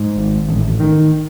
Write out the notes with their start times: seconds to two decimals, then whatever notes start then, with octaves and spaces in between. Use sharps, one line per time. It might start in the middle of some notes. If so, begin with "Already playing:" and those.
Already playing: G#2
0.17 G#1
0.49 A1
0.80 D#3